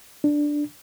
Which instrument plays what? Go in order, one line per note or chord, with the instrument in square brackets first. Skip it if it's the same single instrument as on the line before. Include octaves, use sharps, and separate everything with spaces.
[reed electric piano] D4